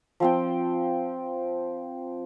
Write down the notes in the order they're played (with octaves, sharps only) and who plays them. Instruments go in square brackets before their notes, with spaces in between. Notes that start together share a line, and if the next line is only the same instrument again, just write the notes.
[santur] F3 C4 G5